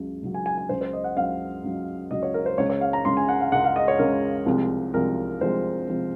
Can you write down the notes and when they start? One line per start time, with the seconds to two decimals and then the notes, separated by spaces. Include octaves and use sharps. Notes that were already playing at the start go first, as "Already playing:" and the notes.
Already playing: C#2 C#3 F#3
0.22 C#2 C#3 F#3
0.34 G#5
0.46 G#5
0.58 G#5
0.69 C#2 C#3 F#3 C5
0.81 C5
0.93 D#5
1.04 F#5
1.17 C#2 C#3 F#3 F5
1.64 C#2 C#3 F#3
2.11 C#2 C#3 F#3 D#5
2.23 C#5
2.34 A#4
2.46 C5
2.58 C#2 C#3 G#3 C#5
2.70 C#5
2.81 F5
2.93 A#5
3.05 C#2 C#3 G#3 C6
3.17 G#5
3.29 F#5
3.41 F5
3.52 C#2 C#3 G#3 F#5
3.64 F5
3.76 D#5
3.88 C#5
3.99 C#2 C#3 G#3 A#4
4.46 C2 C3 F3 G#3
4.94 C2 C3 F3 G#3 A#4
5.41 C2 C3 F3 G#3 C5
5.88 C3 F3 G#3